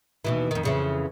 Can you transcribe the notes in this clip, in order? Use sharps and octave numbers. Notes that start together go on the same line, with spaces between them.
D#2 B2 E3
F2 D#3
F2 C#3 E3